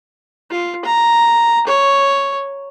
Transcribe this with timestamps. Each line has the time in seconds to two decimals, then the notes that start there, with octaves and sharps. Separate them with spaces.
0.51 F4
0.85 A#5
1.67 C#5